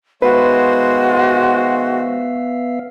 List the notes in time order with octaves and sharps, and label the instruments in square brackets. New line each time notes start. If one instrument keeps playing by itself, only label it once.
[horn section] D#3 G#3 C5 [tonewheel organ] B3 E5 F5 [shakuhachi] F#4 [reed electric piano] B4